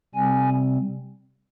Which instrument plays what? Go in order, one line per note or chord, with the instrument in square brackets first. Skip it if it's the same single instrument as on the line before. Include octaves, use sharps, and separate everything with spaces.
[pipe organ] C3 G3 C4 G#5